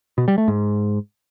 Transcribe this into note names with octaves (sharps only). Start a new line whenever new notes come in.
B2
G3
A3
G#2